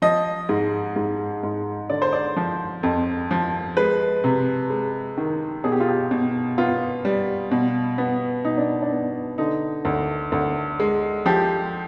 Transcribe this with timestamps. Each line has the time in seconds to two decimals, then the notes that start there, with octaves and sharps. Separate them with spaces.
0.02 F3 D#5
0.49 G#2
0.96 G#2
1.43 G#2
1.90 D3 D5
2.02 C5
2.13 D5
2.36 F3
2.83 F2
3.31 F3
3.77 G#3 B4
4.24 C3
4.70 G#3
5.17 D#3
5.64 B2 G#4
5.72 G4
5.80 F4
5.88 G4
6.11 B2
6.58 B3 F4
7.05 G3
7.51 B2
7.98 B3
8.45 B2 D#4
8.58 D4
8.82 D4
8.92 B3
9.38 D3 D#4
9.85 D2
10.32 D2
10.80 G#3
11.26 F3 G4